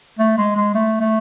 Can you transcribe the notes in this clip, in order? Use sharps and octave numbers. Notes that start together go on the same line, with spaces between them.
A3
G#3
G#3
A3
A3